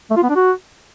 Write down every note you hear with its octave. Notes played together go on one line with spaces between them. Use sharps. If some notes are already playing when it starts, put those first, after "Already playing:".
A3
F4
B3
D4
F#4